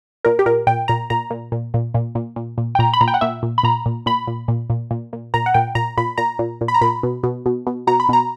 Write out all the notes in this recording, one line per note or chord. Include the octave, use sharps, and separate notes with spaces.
A#2 A#4
G4
A#2 A#4
A#2 G5
A#2 A#5
A#2 A#5
A#2
A#2
A#2
A#2
A#2
A#2
A#2
G5
A#2 A#5
B5
A#2 A#5
G5
F#5
A#2 E5
A#2
B5
A#2 A#5
A#2
A#2 B5
A#2
A#2
A#2
A#2
A#2
A#2 A#5
F#5
A#2 G5
A#2 A#5
A#2 B5
A#2 A#5
A#2
A#2
B5
A#5
A#2 B5
B2
B2
B2
B2
B2 A#5
B5
B2 A#5